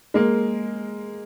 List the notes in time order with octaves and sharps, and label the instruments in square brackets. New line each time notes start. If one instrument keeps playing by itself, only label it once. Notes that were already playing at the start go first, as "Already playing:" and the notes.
[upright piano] G#3 A#3